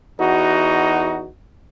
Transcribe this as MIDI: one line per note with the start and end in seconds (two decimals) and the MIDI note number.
0.20 1.28 40
0.20 1.28 63
0.20 1.28 66